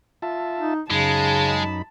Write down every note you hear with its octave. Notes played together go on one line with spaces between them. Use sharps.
F4 E5 A5
D#4
F#2 C#3 G#3 D#4 A5 B5